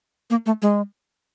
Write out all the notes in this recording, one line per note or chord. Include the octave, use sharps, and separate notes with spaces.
A#3
A3
G#3